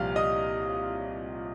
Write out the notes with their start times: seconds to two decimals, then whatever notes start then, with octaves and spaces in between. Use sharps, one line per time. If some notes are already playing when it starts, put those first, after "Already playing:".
Already playing: C2 A#2 F3 G4 F5 F6
0.16 D#5 D#6